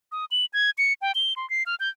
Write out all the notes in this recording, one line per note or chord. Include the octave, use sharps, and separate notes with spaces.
D#6
F#7
G#6
C#7
G5
G7
C6
C7
F6
G6